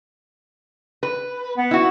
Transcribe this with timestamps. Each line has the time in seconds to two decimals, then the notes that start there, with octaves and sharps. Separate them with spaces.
1.03 B4
1.57 B3
1.71 E4 F#4